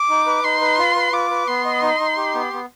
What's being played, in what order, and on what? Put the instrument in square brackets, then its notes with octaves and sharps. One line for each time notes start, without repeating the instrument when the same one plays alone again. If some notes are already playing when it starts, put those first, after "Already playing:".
Already playing: [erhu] D6
[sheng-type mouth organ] D#4
B4
[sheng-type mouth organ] D#4 [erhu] C6
[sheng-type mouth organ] B4
F4
B4
[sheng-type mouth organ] F4 [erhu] D6
[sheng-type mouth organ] B4
[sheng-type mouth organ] B3 [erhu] C6
[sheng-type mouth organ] D#5
D#4
D#4
G4
B3
B3